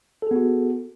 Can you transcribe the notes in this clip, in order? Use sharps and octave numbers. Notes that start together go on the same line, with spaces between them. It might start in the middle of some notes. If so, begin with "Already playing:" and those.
B3 F#4 G#4 A4